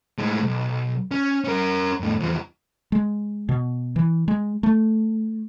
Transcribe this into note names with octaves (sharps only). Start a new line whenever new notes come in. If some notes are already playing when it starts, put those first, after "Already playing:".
A2 G#3
B1
C#4
C#4 A#4
F2 A2
E2 F3
G#3
B2
E3
G#3
A3